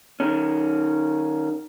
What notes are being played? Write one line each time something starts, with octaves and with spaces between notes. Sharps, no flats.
D#3 C#4